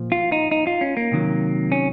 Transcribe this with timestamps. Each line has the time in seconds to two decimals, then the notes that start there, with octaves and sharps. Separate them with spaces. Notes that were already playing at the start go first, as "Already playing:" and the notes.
Already playing: A#2 F3
0.12 F4
0.32 D#4
0.51 D#4
0.67 F4
0.81 C#4
0.97 A#3
1.12 C3 D#3 F#3
1.72 C#4